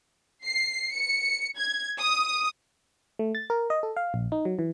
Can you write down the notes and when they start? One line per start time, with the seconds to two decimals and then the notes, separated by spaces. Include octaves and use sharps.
0.45 C7
0.93 C#7
1.58 G#6
1.99 D#6
3.19 A3
3.35 A6
3.50 A#4
3.70 D#5
3.83 A4
3.97 F5
4.14 A#1
4.32 D#4
4.45 F#3
4.59 E3